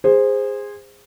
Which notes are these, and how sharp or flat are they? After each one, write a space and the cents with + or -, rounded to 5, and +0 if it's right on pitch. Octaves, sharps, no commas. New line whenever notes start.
G#4 -20 C5 +0